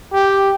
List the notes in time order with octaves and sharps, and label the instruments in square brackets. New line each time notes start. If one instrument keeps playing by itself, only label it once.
[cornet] G4